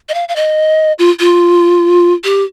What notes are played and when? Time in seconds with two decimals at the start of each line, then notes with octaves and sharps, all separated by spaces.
0.09 D#5
0.14 F5
0.29 F5
0.36 D#5
0.99 F4
1.20 F4
2.24 G4